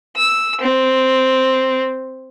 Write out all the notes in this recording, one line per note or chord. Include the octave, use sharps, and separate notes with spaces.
E6
C4